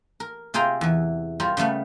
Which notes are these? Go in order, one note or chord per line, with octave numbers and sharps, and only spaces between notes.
A#4
C3 F4 G#4 G5 A#5
E2 E3
G3 F4 A#4
C#3 G3 A3 B3